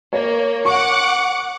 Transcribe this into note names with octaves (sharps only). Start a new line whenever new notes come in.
A#3 C#5
F#5 C#6 D6 C#7